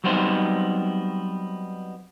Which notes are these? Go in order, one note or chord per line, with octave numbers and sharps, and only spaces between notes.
F#3 G3 B3 C4 D#4 C5